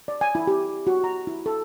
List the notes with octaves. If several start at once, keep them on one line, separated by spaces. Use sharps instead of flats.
D5
G#5
E4
G4
F#4
A#5
E4
A4